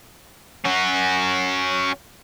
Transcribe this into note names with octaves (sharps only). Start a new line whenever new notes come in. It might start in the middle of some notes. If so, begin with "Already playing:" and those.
C#4 F#4